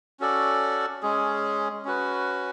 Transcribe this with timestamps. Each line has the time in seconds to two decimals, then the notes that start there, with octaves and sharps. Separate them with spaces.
0.20 C#4 F#4 A4 D5
1.02 G#3 C#4 G#4
1.85 C#4 F#4 B4